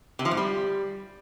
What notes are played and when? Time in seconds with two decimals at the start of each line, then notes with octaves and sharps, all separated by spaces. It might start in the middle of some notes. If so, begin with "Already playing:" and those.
0.19 C3
0.25 F3
0.31 G#2
0.37 G3